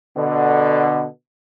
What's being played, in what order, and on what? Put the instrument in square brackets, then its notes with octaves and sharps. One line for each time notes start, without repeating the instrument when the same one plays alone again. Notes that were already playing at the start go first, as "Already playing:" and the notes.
[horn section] B2 D3